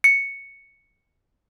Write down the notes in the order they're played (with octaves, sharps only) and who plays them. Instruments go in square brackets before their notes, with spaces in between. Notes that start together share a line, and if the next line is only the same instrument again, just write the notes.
[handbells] C#7